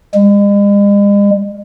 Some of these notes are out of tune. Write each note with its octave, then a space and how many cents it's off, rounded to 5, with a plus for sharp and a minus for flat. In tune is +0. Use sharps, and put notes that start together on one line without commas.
G#3 -45